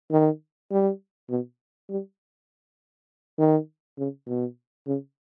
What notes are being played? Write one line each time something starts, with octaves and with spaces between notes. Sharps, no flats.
D#3
G3
B2
G3
D#3
C#3
B2
C#3